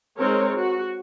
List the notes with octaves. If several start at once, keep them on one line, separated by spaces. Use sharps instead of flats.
G#3 C4 D#4 A#4 C#5
F#4